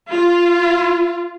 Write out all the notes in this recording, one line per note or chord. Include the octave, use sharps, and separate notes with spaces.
F4